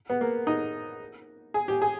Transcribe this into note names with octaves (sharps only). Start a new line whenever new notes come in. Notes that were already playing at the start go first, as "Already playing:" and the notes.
B3
A#3
D#4
G#4
G4
G#4